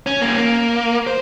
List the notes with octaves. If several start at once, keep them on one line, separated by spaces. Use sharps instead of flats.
C#4
A#3 C#4
A#3
C5